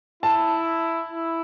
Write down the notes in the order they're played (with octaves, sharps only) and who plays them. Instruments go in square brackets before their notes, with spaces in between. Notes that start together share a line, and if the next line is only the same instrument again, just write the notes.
[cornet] E4 [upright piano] A5
[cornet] E4